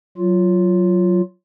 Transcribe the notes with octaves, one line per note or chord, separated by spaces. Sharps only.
F#3 F4